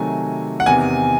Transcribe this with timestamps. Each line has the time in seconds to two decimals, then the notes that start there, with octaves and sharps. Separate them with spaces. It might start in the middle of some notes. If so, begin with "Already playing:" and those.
Already playing: C3 D#3 F#3 A3 G#5
0.60 F#5
0.66 E2 C3 D#3 G#5